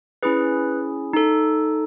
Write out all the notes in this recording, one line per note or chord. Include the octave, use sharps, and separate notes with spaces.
C#4 E4 G#4 B4
D#4 A4